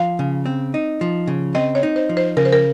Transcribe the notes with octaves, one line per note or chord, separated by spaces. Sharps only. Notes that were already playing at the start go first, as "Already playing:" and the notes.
Already playing: F3 F5
C#3
C4
D#4
F3
C#3
C4 D#5
C#5
D#4
C5
F3
C5
C#3 A#4
C5
A#4